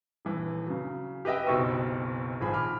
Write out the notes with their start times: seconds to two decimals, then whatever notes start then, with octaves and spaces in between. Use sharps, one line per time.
0.25 D#1 E3
0.66 C#3 F#3
1.25 G4 B4 D#5 E5 G5
1.46 F#1 B1 B2 C4 C#6 E6
2.41 D#1 G#1 F3 G#4 B5
2.54 B5 D6 F6